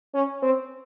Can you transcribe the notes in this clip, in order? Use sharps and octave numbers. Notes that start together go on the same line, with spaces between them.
C#4
C4